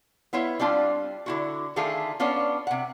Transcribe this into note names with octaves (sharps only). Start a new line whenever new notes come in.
B3 E4 F4 C#5
G3 C4 D4 F4
D3 E4 F#4
D3 D#3 A3 F4 G#4 A4
B3 C#4 D4 F4
C3 F#5